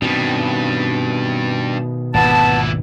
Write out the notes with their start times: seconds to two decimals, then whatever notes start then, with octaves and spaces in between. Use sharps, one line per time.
0.02 G2 B2 D#3 G3 C4
2.14 G#1 D2 A#2 B3 E4 A5